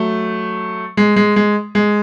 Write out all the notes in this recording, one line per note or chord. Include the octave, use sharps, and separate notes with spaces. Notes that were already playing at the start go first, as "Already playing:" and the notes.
Already playing: F#3 A3
G#3
G#3
G#3
G#3